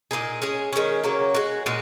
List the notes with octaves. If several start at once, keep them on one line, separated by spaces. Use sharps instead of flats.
A#2 A#3 D#4 G#4
G#3 C#4 G#4
D#3 G#3 C#4
C#3 F#3 A#3 C#4
G#3 F#4
A#2 G#3 F#4